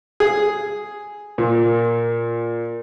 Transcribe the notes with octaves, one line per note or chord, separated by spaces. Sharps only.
G#4
A#2